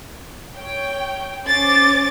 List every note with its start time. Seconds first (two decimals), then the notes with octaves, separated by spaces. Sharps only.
0.55 C#5 G5
1.45 C#4 C5 D6 A6